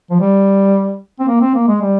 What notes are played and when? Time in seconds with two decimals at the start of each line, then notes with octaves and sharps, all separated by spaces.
0.11 F3
0.20 G3
1.20 C4
1.28 A#3
1.41 C4
1.55 A#3
1.68 G#3
1.82 G3